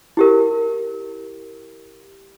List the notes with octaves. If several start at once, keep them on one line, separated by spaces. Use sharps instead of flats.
E4 G4 A#4